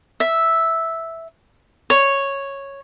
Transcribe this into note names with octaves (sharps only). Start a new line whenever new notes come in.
E5
C#5